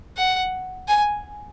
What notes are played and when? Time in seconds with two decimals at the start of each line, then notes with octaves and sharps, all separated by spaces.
0.17 F#5
0.88 G#5